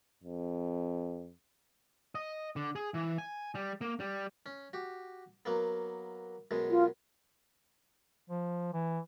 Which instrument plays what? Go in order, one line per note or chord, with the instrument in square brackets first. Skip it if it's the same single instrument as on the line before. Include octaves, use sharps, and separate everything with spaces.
[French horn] F2
[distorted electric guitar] D#5
D3
G#4
E3
G#5
G3
A#3
G3
[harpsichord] C#4
F#4 G4
F#3 A#3 B3
F#2 B2 G#3
[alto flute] F4
[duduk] F3
E3